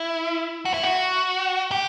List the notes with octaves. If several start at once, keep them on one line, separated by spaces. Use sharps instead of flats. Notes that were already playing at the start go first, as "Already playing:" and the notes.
Already playing: E4
F#4
E4
F#4
G4